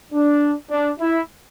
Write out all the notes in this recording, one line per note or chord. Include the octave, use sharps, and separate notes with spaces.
D4
D4
E4